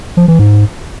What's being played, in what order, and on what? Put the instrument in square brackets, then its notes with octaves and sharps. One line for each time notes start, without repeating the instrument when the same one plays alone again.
[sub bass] F3
E3
G#2